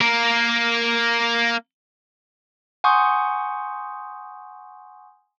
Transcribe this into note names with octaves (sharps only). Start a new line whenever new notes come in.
A#3 A#4
F#5 G#5 C6 C#6 D#6 G6